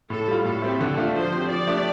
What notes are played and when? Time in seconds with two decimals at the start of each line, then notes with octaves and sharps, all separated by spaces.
0.10 A2 A4
0.28 G3 F4
0.45 A2 A4
0.62 A3 C4 G4
0.81 D3
0.97 A3 D4 F4
1.15 F3 C5
1.32 C4 G4
1.49 F3 D5
1.67 A3 D4 G4